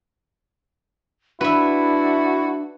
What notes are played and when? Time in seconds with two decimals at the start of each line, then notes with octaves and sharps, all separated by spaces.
1.41 D4 E4 F#4 B4 E5